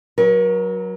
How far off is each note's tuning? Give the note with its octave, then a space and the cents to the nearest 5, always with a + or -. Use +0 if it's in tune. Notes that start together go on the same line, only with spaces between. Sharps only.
F#3 +0 A#4 +40